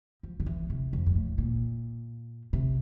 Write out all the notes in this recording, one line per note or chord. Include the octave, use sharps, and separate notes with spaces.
F3
D3
E3
C3
F2
G2
A2
A#2
C3